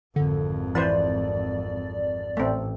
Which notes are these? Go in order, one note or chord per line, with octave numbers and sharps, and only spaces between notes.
G#1 F2 D3
E3 B4 C5 D5
A1 A3 C4